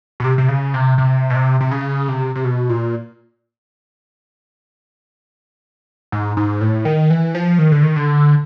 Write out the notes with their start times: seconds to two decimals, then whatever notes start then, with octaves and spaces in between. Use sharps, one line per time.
0.20 B2
0.24 C3
0.38 C3
0.49 C#3
0.74 C3
0.98 C3
1.30 B2
1.35 C3
1.61 C3
1.71 C#3
2.08 C3
2.36 C3
2.45 B2
2.69 A#2
6.12 G#2
6.37 G#2
6.61 A2
6.85 D#3
7.10 E3
7.35 F3
7.59 D#3
7.72 D3
7.83 D#3
7.96 D3